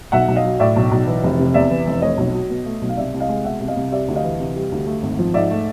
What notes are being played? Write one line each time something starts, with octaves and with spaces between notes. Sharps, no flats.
B1 E5 F#5
B1
D#5 F5
F#3
A2 D5 E5
B1
B1
E3
F1
C3
E2 D5 E5
E3
F1
A3 C#5 D#5
B1
F#3
B2
A3
B1
F5
C2 D5 E5
C2
D#5 F5
G#3
B2 E5 F#5
C2
D#5 F5
C2
G3 D5 E5
D2
D#5 F5
E3
C3
G3
D2
A3
G#1
F3
G#2 D5 E5
A3